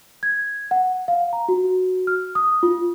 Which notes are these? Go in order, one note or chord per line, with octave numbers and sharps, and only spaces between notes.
G#6
F#5
F5
A#5
F#4
F6
D#6
F4